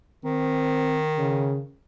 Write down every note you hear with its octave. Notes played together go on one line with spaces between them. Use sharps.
D#3 C4
C#3